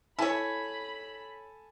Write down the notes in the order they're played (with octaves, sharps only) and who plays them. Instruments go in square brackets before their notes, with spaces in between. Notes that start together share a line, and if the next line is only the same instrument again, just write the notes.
[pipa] E4 C#5 [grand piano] A4 G#5 A5 [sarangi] B5